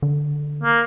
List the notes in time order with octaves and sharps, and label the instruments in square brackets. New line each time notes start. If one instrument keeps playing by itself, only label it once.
[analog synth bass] D3
[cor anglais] A#3